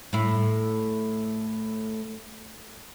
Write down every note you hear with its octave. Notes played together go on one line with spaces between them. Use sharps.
A2 E4